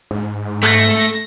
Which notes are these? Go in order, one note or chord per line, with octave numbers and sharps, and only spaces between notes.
G#2
A3 A#6